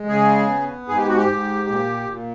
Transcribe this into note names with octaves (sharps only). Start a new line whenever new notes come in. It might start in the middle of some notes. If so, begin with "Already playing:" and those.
Already playing: G#3
C#3 G#4
B3
G#2 G#4
G4
F#4
G4
G#2
A#2
A#2